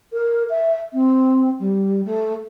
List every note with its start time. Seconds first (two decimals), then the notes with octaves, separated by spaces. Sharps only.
0.13 A#4
0.50 E5
0.93 C4
1.59 G3
2.04 A3